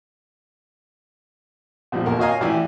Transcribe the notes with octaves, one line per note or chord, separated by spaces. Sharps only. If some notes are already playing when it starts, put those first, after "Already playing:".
A#1 E2 F3 G3
D#2 A#4
F#4 C#5 D#5 F5 G#5 A#5
A1 E3 G4 D5 G#5 E6